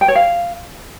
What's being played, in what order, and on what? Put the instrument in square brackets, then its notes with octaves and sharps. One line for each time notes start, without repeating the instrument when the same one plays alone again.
[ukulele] G5
C#5
F5